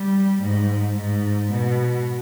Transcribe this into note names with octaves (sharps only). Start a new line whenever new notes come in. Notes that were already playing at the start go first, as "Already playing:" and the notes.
Already playing: G3
G#2
G#2
B2